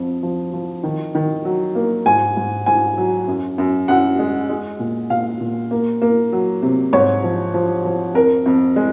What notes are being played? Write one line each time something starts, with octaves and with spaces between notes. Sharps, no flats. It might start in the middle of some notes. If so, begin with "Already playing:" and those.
Already playing: F2 F3
F3
F3
D#3
D#3
F#3
A#3
G#2 G#5
G#2
G#2 G#5
F#3
F#2
F#2
F#2 F#5
G#3
G#3
A#2
A#2 F5
A#2
A#3
A#3
F#3
C3
G#2 C#5
F3
F3
F3
F2 A#4
F2
G#3